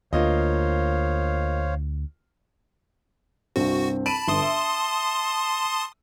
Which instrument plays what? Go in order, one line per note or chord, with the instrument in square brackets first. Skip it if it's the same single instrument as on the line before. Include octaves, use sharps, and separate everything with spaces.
[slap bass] D2 [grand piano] A#3 F4 D#5 [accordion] C5 C#5 F5
[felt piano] C2 G2 C4 [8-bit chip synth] F#4
[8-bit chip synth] A5 B5 [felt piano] D7 D#7
[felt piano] G1 [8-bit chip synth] A5 C6 D#6
[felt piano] E5